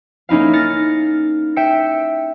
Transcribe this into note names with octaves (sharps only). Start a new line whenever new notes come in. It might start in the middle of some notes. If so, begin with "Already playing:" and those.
A#3 C#4 D#4 E4 F5
F6 A6 A#6 C#7
E5 G5 E6 C#7